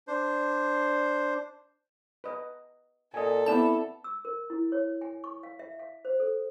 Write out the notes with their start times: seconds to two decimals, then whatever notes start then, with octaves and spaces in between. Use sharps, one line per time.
0.08 D4 C5
2.24 B4 D#5
3.14 A#2 A4 D#5 G#5
3.46 B3 C4 E4 D5 A5 E7
4.04 E6
4.25 A#4
4.50 E4
4.72 C#5
5.01 G#5
5.24 C#6
5.43 F5
5.59 E5
5.79 F5
6.05 C5
6.20 A4